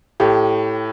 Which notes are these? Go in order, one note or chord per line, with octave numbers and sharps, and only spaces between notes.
A2 G4